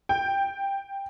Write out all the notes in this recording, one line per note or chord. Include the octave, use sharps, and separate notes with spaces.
G5